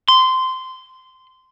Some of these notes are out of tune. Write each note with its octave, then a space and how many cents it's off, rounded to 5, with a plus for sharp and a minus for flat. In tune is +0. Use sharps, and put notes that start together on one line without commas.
C6 -15